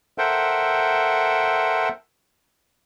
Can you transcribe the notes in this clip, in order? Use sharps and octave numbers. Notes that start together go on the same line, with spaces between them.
A4 A#4 C5 E5 F#5 G5